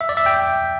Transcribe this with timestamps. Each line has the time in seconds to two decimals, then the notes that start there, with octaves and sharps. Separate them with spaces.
0.01 E5
0.09 D5
0.17 E5
0.26 G5